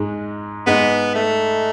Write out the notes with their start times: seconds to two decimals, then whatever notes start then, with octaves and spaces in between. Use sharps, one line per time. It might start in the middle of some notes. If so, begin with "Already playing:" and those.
Already playing: G#2 G#3
0.67 G#2 G#3 B3
1.15 A3